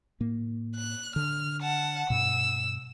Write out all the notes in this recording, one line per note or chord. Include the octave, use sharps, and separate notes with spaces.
A2 A#3
F#6
D3 F6
F#5 A5
G2 B2 E6